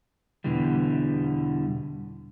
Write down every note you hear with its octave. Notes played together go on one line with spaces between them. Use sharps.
E2 B2 D3 E3 G3